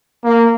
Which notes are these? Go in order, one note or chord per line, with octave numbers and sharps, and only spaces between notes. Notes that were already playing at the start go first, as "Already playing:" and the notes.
A#3